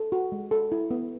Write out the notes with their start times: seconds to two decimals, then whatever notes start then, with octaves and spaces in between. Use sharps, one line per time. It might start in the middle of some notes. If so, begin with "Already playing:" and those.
Already playing: A4
0.12 F#4
0.32 G#3
0.51 A4
0.72 E4
0.91 B3